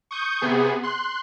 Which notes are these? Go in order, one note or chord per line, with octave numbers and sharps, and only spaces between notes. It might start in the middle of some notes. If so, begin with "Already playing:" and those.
C#6 D#6 G6
C3 B3 G#4
C6 F#6